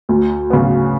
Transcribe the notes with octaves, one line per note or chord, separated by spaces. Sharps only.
D2
C#3 F#3 B3